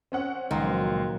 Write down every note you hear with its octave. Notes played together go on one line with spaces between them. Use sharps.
C4 C#4 F#5
C#2 A#2 D#3 F3 F#3 A#5 C6